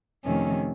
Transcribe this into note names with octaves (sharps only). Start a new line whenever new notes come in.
F2 C3 D#3 A3 C#4